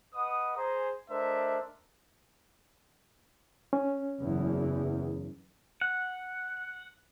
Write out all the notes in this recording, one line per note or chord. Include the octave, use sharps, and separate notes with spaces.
B4 D#5 F#5 D#6
G#4 C5 G#5 A#5
A3 D4 A#4 C5 D#5 E5
C#4
F#1 E2
F#5